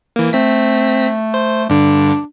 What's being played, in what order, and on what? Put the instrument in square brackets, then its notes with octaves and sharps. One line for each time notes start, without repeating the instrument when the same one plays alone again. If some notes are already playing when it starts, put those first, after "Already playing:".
[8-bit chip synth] E3 A#3
[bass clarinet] A3 [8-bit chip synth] C4 B6
[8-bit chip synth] C5
[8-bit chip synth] G2 D3 [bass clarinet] D4